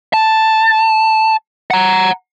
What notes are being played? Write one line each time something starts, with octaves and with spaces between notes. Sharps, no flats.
A5
F#5 A#5